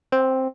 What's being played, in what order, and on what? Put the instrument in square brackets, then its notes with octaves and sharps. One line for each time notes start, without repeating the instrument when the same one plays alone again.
[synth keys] C4